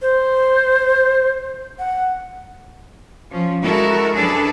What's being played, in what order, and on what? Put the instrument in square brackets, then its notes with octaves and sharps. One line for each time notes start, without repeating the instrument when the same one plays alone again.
[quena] C5
F#5
[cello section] F3 C#4
G#3 E4 F#4 A4 A#4
F#2 D4 G#4 A4 B4 D5